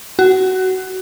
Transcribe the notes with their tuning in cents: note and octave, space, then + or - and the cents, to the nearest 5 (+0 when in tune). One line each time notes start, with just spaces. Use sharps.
F#4 +20